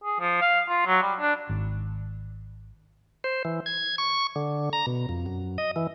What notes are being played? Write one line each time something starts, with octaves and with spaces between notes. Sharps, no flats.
G#4
F3
F5
F4
F#3
G3
D4
G#1
C5
E3
G#6
C#6
D3
A#5
B2
F2
F#2
D#5
E3